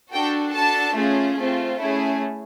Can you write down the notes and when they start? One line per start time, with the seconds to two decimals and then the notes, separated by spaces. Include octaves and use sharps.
0.13 D4 F#4 A4 G5
0.55 D4 F#4 A4 A5
0.96 A3 C#4 F4 G#4
1.38 A3 C4 F4
1.79 A3 C#4 E4 G#4